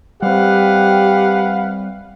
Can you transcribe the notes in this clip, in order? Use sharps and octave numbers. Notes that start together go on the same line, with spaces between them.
G3 C4 G4 B4 F5 F#5